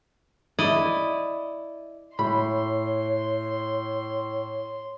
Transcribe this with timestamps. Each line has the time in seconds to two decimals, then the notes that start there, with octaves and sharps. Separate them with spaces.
0.59 E4 D5 D#5
2.19 A2 C#5 B5 C6